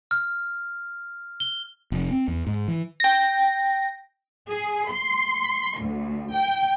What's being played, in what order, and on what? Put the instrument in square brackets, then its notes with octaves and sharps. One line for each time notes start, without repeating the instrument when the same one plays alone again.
[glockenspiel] F6
G7
[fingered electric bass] F1
C4
E2
G#2
E3
[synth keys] G5 A#6
[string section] G#4
C6
D2
G5